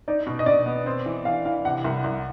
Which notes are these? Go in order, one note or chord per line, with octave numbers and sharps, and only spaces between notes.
D#4 D5
B2
D#5
B2 D5
B3
C4
E3
E3 F5
E3 F5
C3 F#5
C2
C2